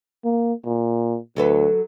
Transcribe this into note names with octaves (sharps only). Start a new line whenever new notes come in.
A#3
A#2
D2 F#3 A4 B4